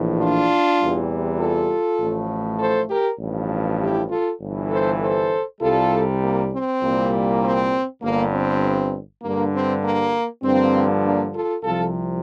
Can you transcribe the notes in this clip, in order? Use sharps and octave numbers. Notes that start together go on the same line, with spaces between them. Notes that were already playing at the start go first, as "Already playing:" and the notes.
Already playing: A#1 A2 E3
D4 F4
E2 C3 E3 G3
F4 A4
A1 A2 F3 A3
A4 C5
G4 A#4
A1 G2 F3
E4 G4
F4 A4
G1 G2 E3
A4 C5
A4 C5
C2 C3 G3 F4 A4
A#3
C4
C2 A#2 G3 A#3
C4
G1 G2 D3 A#3
C4
G2 D3 G3 A#3
C4
A#3
G2 D3 F3 A#3 C4
A#3 D4
F4 A4
C2 C3 F3 F4 A4